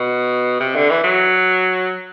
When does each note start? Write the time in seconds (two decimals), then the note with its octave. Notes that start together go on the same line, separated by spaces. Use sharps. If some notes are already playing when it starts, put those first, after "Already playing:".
Already playing: B2
0.60 C3
0.75 D3
0.90 E3
1.03 F#3